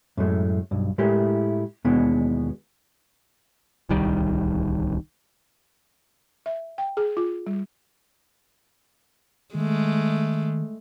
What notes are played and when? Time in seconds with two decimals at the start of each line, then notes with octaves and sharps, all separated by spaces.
0.17 F#2 A2 G#3 A3
0.71 B1 G2
0.98 A2 G#3 A3 E4 G4 A#4
1.85 D#2 B2 E3 G#3 B3 D4
3.89 D1 C2 D#3 G3
6.46 E5
6.78 G5
6.97 G#4
7.17 F4
7.47 G3
9.55 D#3 G#3 A3